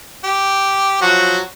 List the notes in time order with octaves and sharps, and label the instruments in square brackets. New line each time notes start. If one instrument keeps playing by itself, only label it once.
[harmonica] G4
F3 F#3 F#4